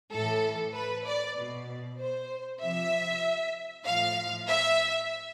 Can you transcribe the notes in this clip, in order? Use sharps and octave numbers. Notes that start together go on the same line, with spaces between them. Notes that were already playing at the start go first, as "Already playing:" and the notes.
A2 E3 A4
B4
D5
B2
C5
C3 F3 E5
A2 F3 F5
E5